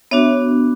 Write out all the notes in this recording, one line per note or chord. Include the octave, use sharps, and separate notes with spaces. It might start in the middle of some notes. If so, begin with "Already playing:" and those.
B3 D4 F#4 C#5 E5